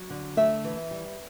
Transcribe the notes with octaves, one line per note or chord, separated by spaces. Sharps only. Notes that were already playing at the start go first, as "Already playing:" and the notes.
Already playing: F#3
D3
A3 E5
E3
G3